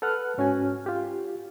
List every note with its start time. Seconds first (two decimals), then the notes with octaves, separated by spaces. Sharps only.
0.02 A4 B4 F#5 F6 F#6
0.38 G#2 C#4 F#4 G#5
0.86 F4 G4